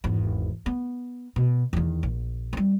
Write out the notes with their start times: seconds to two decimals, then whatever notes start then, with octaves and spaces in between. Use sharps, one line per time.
0.04 G#1 E2
0.66 B3
1.36 B2
1.73 E2 D#3
2.03 A#1
2.53 G3 C4